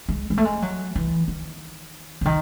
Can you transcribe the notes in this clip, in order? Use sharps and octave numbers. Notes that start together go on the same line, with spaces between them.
G#3
G#3
A3
G#3
F#3
E3
D#3
C#3
D#3